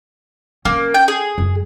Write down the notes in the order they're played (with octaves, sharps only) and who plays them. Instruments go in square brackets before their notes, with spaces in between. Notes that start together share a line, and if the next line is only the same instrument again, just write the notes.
[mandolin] A#3 [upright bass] C#4
[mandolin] G5
G#4
[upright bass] F#2 F#3